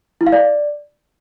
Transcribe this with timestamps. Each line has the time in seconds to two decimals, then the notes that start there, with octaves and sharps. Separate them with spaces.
0.21 E4
0.27 F5
0.32 D5